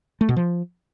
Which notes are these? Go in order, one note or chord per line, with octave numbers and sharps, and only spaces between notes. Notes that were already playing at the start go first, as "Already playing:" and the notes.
A3
B2
F3